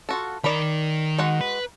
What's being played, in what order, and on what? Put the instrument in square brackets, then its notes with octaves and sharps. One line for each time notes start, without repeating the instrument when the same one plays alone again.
[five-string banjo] F4 F#4 A4
[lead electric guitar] D#3 A#4 [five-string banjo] D5 B5
[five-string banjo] G#3 F#4 F#5
[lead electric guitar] B4